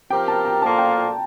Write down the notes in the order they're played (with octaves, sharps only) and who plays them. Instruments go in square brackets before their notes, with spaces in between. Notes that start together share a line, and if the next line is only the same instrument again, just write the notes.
[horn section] F3 C4 G4 A#4 [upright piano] G5
[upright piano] A5
A#5
[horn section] A#2 F3 A#3 F4 A4 [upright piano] A5
[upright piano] G5